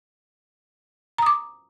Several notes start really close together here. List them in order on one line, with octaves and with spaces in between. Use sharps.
A#5 D#6 D6